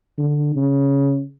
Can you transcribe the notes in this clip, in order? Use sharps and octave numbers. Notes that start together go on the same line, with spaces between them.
D3
C#3